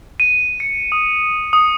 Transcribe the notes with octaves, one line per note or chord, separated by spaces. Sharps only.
D#7
C#7
D#6
D#6